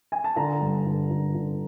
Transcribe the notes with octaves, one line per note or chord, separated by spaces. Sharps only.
G#5
A5
D3 A#5
G2
D3
D3
D3